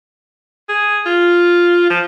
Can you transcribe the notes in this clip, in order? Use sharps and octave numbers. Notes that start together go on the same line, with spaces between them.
G#4
F4
F3